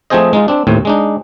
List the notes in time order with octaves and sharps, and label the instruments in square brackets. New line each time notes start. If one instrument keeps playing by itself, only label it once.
[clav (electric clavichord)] F3 A3 C4 G#4 C5 D#5
G#3 D#4 F4
C4 D4
D#2 A2 C4
G#3 D4 D#4